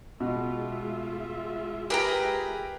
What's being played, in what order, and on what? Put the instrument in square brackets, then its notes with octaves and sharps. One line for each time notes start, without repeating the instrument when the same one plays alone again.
[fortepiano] B2 [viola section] G#3 F4 E5
[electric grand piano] G4 A#4 B4 [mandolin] G#4 G5 A#5